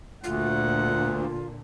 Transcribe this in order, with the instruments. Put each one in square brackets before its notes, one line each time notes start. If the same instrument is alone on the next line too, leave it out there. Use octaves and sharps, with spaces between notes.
[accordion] D2 [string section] A#2 D3 [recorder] F4 [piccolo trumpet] F#5